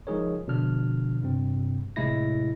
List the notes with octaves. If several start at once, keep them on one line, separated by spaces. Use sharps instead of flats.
F3 G#3 D#4 G#4 A#4 C#5
B2 D3 F3 D4 F6
G2 C3 C4
A1 A2 C3 G#3 E4 A#6